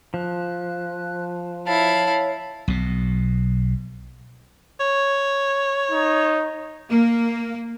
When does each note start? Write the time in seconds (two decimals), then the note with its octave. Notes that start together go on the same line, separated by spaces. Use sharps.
0.14 F3 F#6
1.67 E4 C#5 F5 A5
2.68 B1 B2
4.80 C#5
5.92 D#4
6.89 A#3